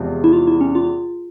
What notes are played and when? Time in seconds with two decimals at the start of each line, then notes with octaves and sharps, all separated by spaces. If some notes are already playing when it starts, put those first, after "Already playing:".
Already playing: E2 C3 F3 G#3
0.24 E4
0.33 F4
0.47 E4
0.61 C#4
0.75 F4